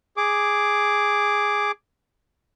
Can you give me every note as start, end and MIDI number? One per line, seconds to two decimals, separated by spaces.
0.17 1.71 68
0.17 1.71 86